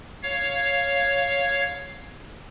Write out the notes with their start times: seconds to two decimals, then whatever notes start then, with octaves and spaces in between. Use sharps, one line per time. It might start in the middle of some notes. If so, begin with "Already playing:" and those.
0.23 C#5 F5